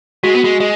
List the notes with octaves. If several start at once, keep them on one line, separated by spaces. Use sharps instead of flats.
G#3 F#4
B3
G#3
G#3 D#5